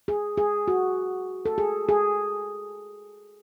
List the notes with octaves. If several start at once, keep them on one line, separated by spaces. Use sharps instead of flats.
G#4
G#4
F#4
A4
G#4
G#4